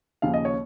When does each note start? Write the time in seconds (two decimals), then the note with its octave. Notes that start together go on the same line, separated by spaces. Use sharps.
0.22 D#2 C#3 F3 F5
0.34 D#5
0.45 C#5